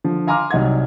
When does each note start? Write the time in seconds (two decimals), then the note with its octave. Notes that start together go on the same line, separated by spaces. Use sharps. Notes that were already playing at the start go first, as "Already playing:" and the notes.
0.04 D3 F3
0.27 F5 G#5 A#5 C6 D6 F6
0.51 C2 F#3 D#4 F#5 G#6